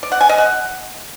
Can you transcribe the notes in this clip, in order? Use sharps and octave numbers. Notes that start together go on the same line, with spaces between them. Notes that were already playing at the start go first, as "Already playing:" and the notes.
D5
F#5
G#5
D#5
F#5